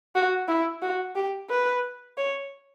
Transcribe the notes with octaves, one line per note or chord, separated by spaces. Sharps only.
F#4
E4
F#4
G4
B4
C#5